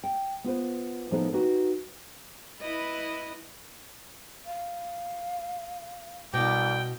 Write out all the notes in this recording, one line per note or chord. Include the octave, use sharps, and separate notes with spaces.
G5
B3 F4 B4 C5
A2 F3 B3 D#4 A4
D#4 F#4 G4 B4
E4 B4 D#5
F5
C2 B2 G5 D6